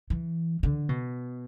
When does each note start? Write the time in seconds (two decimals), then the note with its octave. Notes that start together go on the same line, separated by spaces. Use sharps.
0.10 E3
0.63 D3
0.89 B2